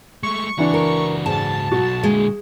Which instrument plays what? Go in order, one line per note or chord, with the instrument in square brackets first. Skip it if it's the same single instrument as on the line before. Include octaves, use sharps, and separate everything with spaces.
[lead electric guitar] G#3 A3 [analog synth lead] C#6
[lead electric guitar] C#2 F#4 [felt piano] E3 D4
[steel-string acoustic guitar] A#4
[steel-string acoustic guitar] G#2 [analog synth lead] A5
[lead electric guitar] B1 [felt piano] F#4
[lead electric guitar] A#2 D3 [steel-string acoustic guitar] G#3